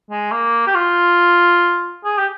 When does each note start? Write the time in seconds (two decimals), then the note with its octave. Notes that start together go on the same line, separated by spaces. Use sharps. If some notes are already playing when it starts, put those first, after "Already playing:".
0.10 G#3
0.32 A#3
0.67 G4
0.74 F4
2.05 G#4
2.18 G4